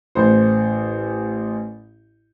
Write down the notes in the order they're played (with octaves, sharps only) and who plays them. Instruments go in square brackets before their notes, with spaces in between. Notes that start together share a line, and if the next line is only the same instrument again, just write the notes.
[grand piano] A1 C5